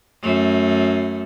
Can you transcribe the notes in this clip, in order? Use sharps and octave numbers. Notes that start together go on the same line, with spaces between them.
F#2 A3